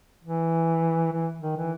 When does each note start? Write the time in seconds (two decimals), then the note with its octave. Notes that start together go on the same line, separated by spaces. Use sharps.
0.24 E3
1.12 E3
1.41 D#3
1.57 E3